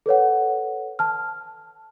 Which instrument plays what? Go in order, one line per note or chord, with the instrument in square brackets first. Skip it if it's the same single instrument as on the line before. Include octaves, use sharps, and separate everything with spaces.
[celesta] A4 B4 C#5 F#5
A5 F6